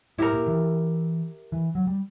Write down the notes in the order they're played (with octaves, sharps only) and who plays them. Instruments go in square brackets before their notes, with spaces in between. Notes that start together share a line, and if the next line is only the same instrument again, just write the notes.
[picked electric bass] A2 [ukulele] E4 G4 A#4
[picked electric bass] A#2
E3
E3
F#3
G3